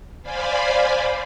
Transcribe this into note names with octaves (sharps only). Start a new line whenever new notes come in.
C5 D5 F5 G#5 B5